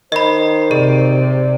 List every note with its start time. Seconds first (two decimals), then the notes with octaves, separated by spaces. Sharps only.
0.12 D#3 C5 D#5 B5
0.71 C3 G#4 D5